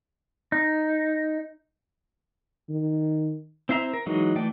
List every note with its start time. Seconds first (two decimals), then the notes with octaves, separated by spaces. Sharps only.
0.52 D#4
2.70 D#3
3.69 C4 E4 C5 E5 A#5
3.93 A#4
4.06 E3 F#3 G#3 D#4
4.36 E3 A3 D5 G5